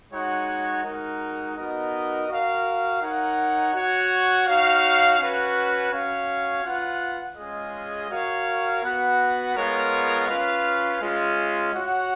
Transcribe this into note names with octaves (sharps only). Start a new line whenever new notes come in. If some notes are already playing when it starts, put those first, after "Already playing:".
G#3 D#4 F#4 C#5 F#5
G#3 D#4 F#4 A#4
B3 D#4 F#4 A#4 D#5
F#4 A#4 F5
D#4 A#4 C#5 F#5
F#4 C#5 F#5
D#4 F#4 C#5 F5
C#4 F#4 B4
C#4 F#4 C#5 F5
F4 B4 F#5
G#3 C#4 F4 G#4 D#5
F#4 A#4 C#5 F5
B3 F#4 B4 F#5
G#3 B3 F4 A#4 C#5
C#4 F4 B4 F5
G#3 C#4 F4
F#4 C#5 F#5